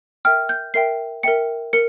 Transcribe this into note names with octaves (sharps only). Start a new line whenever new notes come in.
A#4 E5 G5 F6
G6
A#4 E5 G5 C7
A#4 E5 G5 C#7
A#4 C#7